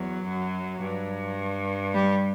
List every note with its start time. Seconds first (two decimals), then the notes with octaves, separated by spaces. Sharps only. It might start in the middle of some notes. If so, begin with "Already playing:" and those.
Already playing: E2 F#3
0.24 F#2
0.81 G2
1.94 G3